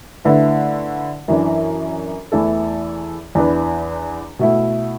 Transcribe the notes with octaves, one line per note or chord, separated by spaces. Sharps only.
D3 A3 E4 B4
F#2 E3 D4
E2 E3 A3 E4 A4
E2 E3 D4 B4
B2 A3 E4